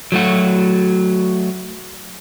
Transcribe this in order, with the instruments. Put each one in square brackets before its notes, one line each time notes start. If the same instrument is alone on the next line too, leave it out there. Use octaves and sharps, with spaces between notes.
[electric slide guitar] F#3 A3 F#4